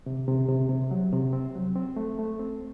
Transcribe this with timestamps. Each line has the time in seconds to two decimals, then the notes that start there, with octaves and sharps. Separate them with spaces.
0.06 C3
0.28 C3
0.48 C3
0.69 C3
0.91 F#3
1.13 C3
1.33 C4
1.55 F#3
1.76 C4
1.96 A3
2.19 A3
2.39 C4